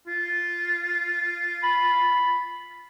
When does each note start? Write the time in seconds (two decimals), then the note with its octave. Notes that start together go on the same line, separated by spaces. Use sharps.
0.07 F4
1.63 B5